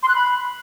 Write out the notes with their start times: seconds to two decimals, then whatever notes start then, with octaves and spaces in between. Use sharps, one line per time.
0.02 C6
0.08 F#6
0.15 B5